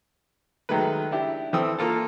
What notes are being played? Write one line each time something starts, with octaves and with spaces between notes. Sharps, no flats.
D#3 F#3 G#3 A3 B4
D4 E4 G4
E3 C4 A4 G5 D#6 E6
A#3 F4 A4